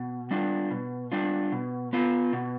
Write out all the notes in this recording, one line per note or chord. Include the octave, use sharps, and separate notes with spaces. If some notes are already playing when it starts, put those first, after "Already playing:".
Already playing: B2
G3 D4 F4
B2
G3 D4 F4
B2
B3 F4
B2